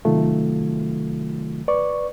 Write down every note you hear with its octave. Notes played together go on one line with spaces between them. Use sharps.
C3 D#3 F#3 A3 F4
B4 D5 C#6